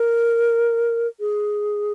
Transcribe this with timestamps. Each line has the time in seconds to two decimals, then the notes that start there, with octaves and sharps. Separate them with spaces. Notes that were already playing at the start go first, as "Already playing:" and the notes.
Already playing: A#4
1.20 G#4